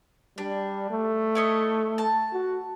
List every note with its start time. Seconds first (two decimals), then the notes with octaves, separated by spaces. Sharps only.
0.38 G3 D4
0.91 A3
1.35 E4 C#5 D#5
1.98 A5
2.33 F#4